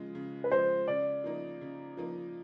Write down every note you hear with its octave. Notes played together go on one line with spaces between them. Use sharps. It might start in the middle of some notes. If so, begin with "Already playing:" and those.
Already playing: C#3 F3 G#3
C#3
B4
F3 G#3 C5
C#3 D5
F3 A#3 D#4
C#3
F3 A#3 D#4